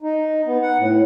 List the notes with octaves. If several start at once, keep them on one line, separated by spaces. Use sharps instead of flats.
D#4
B3
F#5
A2